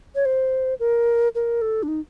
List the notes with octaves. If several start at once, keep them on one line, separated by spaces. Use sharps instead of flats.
C#5
C5
A#4
A#4
A4
D4
D#4